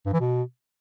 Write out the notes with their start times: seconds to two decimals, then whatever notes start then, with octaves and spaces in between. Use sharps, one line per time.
0.06 G2
0.13 E3
0.20 B2